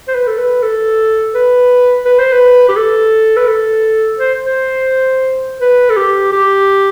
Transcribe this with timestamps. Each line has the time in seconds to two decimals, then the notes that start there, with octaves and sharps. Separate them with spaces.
0.08 C5
0.15 B4
0.27 A4
0.38 B4
0.62 A4
1.34 B4
2.05 B4
2.19 C5
2.33 B4
2.69 G4
2.76 A4
3.37 B4
3.47 A4
4.19 C5
4.45 C5
5.61 B4
5.90 A4
5.97 G4
6.32 G4